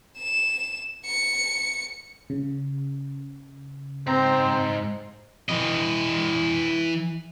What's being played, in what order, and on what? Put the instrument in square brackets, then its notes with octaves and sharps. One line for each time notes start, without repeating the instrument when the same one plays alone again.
[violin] E7
C#7
[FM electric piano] C#3
[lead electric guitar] G#2 A#5 [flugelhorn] C4 [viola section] C5
[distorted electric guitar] E3 D#5